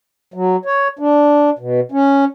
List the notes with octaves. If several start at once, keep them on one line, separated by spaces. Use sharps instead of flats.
F#3
C#5
D4
B2
C#4